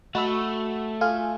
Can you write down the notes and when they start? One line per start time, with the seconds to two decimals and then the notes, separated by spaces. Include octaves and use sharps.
0.15 A3 F#4 D#5 B5 E6
1.01 F4 A4 G#5 F6